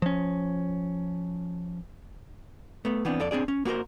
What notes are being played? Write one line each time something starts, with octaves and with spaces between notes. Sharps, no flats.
F3 C#4
A3 B3
E3 B3 C4 D4
F2 A4 D5
C4 D4 G#4 D5
C#4
A#3 F#4 G4 A#4 C5